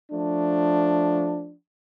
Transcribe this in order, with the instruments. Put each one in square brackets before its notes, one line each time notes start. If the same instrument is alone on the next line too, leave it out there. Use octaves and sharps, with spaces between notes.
[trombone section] F3 A3 D4